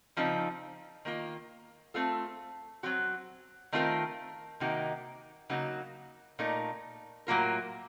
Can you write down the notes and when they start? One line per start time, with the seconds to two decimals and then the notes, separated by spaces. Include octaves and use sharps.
0.17 C#3 F3 C4 D#4
1.05 D#3 A#3 F4
1.94 A3 C4 F4 A4
2.83 F#3 C4 F#4
3.72 D#3 A3 C4 F4 A#4
4.60 C3 D#3 A#3 D#4 F#4
5.50 C#3 F#3 A#3 D#4 F#4
6.39 A#2 A3 D#4 A#4
7.27 A2 F#3 A#3 F4 A#4